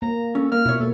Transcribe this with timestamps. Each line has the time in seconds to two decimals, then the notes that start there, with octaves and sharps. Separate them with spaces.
0.02 A#3 A#5
0.35 C#4 A4
0.52 A#3 F6
0.65 B2 E4 C#5
0.80 A#3 A4